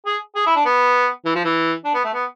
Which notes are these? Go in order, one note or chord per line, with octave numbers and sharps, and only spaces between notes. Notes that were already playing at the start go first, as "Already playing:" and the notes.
G#4
G#4
E4
D4
B3
E3
F3
E3
D4
B3
A3
B3